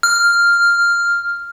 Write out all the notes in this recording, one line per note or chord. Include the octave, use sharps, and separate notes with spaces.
F6